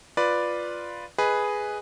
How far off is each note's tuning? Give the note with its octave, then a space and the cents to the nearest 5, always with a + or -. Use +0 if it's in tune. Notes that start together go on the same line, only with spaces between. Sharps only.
F4 +0 B4 +0 D5 +0
G#4 +0 B4 +0 D#5 +0